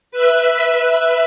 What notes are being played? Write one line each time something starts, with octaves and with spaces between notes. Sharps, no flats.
B4 E5